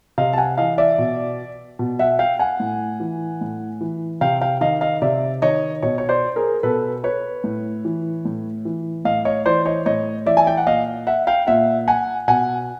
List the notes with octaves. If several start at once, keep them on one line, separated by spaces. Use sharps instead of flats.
C3 D#5 F5
A5
F#5 G#5
E3 D#5 F5
D5 E5
B2
B2
E5 F#5
F5 G5
F#5 G#5
A2
E3
A2
E3
C3 F5 G5
F5 G5
D#3 D#5 F5
D#5 F5
C3 D5 E5
D#3 C#5 D#5
B2 C#5 D#5
C#5
C5 D5
G#4 A#4
B2 A4 B4
B4 C#5
A2
E3
A2
E3
A2 D#5 F5
C#5 D#5
E3 C5 D5
C#5 D#5
A2 C#5 D#5
E3 D5 E5
G#5
G5
F#5
A#2 D#5 F5
E5 F#5
F5 G5
A#2 E5 F#5
F#5 G#5
B2 F#5 G#5